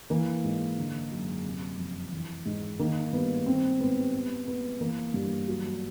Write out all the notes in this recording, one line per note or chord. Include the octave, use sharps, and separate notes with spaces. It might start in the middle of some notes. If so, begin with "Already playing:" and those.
E3 A#3
G#2
D3
F#2
C3
F2
E3
G#2
D#3 A#3
G2 B3
D#3 C4
G#2 B3
G3 B3
A#2 B3
E3 A#3
G2
F#3